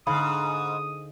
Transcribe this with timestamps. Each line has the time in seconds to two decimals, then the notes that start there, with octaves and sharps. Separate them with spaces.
0.07 G#2 D3 F5 B5 D#6